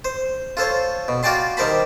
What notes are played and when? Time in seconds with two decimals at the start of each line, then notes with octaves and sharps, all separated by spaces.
0.05 C5
0.57 F4 A4 C5 C#5
1.08 B2
1.23 F4 F#4 D5 G5 A5 C6
1.57 D#3 G3 A#4 C5 A5 B5